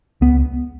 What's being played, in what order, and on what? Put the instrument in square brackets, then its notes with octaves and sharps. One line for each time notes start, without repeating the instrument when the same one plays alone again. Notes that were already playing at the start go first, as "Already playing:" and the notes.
[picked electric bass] C#2 B3